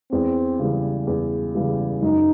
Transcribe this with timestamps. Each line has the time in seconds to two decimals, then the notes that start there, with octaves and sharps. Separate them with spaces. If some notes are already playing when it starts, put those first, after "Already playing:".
0.12 E2 C4
0.59 C#3 E3 G3
1.07 E2
1.55 C#3 E3 G3
2.02 F#2 D#4